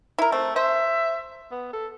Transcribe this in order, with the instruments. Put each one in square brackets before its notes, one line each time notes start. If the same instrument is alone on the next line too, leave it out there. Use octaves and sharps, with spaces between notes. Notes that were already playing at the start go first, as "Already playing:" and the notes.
[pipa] E4 A#4
[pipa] A3 [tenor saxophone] C4
[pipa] C5 [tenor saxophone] E5
[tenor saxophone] B3
A4